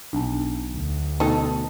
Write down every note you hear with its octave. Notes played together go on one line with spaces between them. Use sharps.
B1 D4 A5
D2
B2 A3 D#4 A4